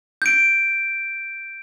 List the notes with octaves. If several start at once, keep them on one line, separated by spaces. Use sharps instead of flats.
G6 D7